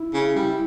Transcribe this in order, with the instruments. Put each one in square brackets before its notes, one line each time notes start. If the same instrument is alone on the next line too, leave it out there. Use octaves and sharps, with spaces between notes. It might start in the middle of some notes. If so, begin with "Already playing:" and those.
Already playing: [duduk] E4
[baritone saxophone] C#3
G3